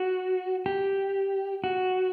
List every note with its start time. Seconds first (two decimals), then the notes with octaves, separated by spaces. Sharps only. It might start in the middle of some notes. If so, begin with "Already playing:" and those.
Already playing: F#4
0.66 G4
1.64 F#4